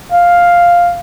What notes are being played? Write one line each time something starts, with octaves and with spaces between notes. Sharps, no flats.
F5